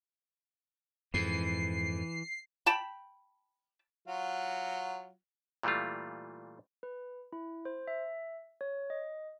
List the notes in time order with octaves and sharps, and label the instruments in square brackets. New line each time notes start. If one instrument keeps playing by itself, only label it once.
[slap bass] F2 G#2 [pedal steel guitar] E3 [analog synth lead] C7
[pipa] G5 A5 B5
[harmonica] F#3 F4 F#4
[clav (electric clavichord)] A#2 E3 G3 A3 F4
[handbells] B4
E4
C5
E5
C#5
D#5